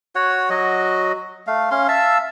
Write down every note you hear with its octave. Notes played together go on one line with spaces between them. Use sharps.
F#4 C#5 F#5
F#3 F#4 D#5
A3 F5
C#4 F5 C6
E5 F5 A5 E6